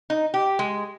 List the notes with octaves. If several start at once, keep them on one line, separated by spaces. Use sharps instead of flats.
D#4
G4
G#3